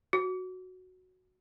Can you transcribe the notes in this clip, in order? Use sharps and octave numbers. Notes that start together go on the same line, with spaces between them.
F#4